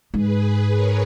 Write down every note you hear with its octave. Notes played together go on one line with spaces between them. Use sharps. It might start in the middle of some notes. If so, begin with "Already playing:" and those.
G#2 G#4 B4
A#4 C#5